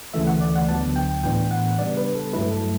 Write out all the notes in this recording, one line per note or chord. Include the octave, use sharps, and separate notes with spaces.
D2 C#3 E3 A3 E5
F#5
D5
F#5
D2 D3 F#3 B3 D4 A5
G5
A2 E3 B3 D4 G5
F#5
C#3 G3 B3 D4 D5
B4
A4
G2 F#3 A3 E4 B4
A4